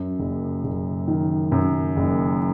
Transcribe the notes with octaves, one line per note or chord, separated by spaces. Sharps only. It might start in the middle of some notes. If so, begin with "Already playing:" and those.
Already playing: F#2
F#1
F#1
D#3
F#2
F#1